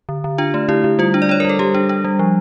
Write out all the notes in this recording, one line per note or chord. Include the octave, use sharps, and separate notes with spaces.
D3
D3
D4 F4
A3
D3 E4
D3
G3 F4
D4
D5
D4 C#5
A#4
G3 A4
G3 G4
D4
D4
G3
F3